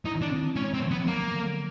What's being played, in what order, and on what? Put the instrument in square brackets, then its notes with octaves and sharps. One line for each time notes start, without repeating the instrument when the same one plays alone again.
[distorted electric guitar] D#4 [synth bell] E4
[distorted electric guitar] D4
[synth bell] C4
[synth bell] G#3 [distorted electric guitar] C#4
[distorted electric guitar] C4
[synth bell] F3
[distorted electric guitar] B3
[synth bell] F#3 [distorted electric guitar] A#3
[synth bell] D3